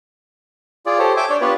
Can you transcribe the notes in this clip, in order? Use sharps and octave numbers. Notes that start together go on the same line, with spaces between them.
F4 G#4 D5
G4 A4 C5 C#5
E5 G5 G#5 D6
D4 C#5 D5
B3 D4 F4 G4 B4 C#5